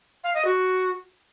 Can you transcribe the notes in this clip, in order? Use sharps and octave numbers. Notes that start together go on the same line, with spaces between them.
F5
D#5
F#4